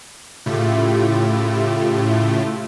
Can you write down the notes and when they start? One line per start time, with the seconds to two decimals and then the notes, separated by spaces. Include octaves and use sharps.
0.46 A2 C#3 A3 E4 F4 G4